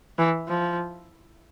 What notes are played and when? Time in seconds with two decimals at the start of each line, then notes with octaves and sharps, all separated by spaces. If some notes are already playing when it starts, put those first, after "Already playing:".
0.18 E3
0.48 F3